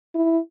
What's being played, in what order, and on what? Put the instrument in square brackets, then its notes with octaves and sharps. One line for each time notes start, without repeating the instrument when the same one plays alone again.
[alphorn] E4